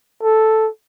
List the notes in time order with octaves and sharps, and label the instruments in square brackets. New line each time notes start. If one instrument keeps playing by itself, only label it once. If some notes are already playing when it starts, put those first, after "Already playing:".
[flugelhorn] A4